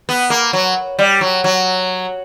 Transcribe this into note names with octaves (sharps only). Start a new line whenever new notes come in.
B3
A#3
F#3
G3
F#3
F#3